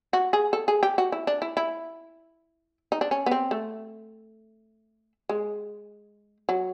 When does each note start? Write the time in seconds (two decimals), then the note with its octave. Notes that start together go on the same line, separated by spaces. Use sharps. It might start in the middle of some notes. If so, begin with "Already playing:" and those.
0.13 F#4
0.33 G#4
0.53 A4
0.68 G#4
0.83 G4
0.98 F#4
1.12 E4
1.27 D4
1.42 E4
1.57 E4
2.92 D#4
3.01 D4
3.11 C#4
3.26 B3
3.31 C4
3.51 A3
5.29 G#3
6.49 F#3